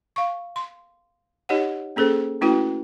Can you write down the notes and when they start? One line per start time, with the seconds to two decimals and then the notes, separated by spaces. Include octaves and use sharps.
0.16 F5 C#6
0.56 C6
1.49 D#4 G4 C#5 D#5 F#5
1.96 A#3 C#4 G#4 A4 C5
2.41 A3 C#4 E4 F#4 B4 G5